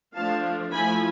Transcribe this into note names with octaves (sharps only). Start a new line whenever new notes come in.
F3 A3 D4 F5 A5
F3 A3 E4 G#5 B5